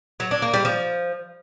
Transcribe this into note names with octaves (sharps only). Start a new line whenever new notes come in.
F#3
D4
A#3
G3
F3